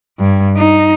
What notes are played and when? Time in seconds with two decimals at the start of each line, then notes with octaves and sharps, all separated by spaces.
0.19 G2
0.57 D#4